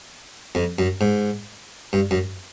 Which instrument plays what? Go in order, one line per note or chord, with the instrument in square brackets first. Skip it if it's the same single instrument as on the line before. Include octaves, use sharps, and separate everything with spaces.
[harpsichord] F2
F#2
G#2
G2
F#2